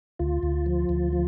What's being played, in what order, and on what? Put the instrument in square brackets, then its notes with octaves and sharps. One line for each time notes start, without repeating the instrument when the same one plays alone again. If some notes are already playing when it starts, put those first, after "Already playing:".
[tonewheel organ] D2 F4
D2
F3
D2
F3